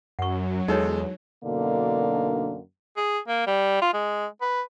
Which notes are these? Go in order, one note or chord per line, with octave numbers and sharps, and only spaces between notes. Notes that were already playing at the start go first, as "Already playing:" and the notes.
F#2 F#3 F#5 C#6
E2 G#3 D#4 A4 C#5
F#2 B2 D3 A#3 D4 D#4
G#4
A#3
G3
F4
G#3
B4